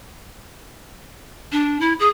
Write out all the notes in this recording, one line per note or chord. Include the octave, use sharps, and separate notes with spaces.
D4
E4
G#4